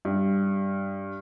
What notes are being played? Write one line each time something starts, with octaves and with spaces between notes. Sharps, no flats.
G2